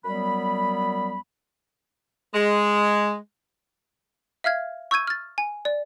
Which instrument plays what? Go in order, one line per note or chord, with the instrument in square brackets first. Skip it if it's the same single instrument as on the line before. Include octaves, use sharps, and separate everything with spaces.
[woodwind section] F#2 F#3 G3 B3 B5
[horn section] G#3
[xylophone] E5 F5 F6 G#6
C#6 E6 G6 G#6 D#7
F6 A6
G#5
D5